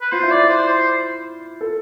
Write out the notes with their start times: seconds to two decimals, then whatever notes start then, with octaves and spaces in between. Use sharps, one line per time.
0.01 B4
0.12 F4 C5
0.23 E4
0.31 F4 D5
0.49 C5
0.68 C5
1.61 A4